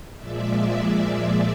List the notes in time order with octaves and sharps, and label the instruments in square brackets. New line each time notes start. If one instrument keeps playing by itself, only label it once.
[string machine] A#2 F3 G#3 D5 E5